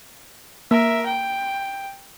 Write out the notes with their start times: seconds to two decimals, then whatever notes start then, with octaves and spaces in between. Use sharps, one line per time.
0.71 A#3 A#4 E5
1.06 G5